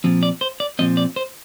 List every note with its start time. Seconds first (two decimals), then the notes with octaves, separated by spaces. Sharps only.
0.04 A#2 F3 C4
0.23 D5
0.41 C5
0.60 D5
0.79 A#2 F3 C4 D#5
0.97 D5
1.16 C5